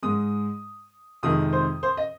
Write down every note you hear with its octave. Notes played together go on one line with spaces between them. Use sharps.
G#2 G#3 D#6
F2 C3 D#3 G#3 D#6
C5
C5
D#5